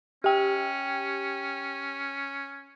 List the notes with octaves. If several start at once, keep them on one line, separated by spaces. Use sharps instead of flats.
C#4 G4 G5